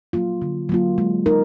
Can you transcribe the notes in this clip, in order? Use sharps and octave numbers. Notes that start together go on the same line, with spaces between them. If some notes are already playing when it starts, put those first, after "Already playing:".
F#3 A#3 F4
D3
F#3 A#3 F4
G#3
D#4 A#4